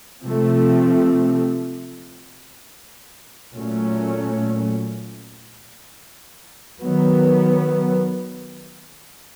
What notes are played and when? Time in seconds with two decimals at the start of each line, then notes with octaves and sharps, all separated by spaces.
0.24 C3 F3 A3 C4
3.52 A#2 F#3 A3 C#4
6.81 D#3 F#3 B3